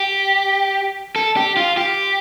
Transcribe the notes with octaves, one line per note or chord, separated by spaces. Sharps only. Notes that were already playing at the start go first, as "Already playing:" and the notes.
Already playing: G4
A4
G4
F4
G4